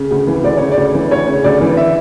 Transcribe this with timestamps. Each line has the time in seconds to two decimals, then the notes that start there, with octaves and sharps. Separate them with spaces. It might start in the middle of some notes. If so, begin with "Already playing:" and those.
Already playing: C#3
0.11 D2
0.27 E3
0.43 D2 D5
0.57 C#3 C#5
0.72 D5
0.77 D2
0.94 E3
1.11 D2 C#5
1.27 C#3
1.44 D2 D5
1.61 E3
1.77 E5